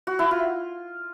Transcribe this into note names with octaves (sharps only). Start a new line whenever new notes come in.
F#4
E4
F4